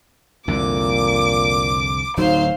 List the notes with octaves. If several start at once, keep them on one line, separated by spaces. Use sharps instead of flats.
C2 F2 A#2 D3 D6
D1 F#3 D#4 C5 F5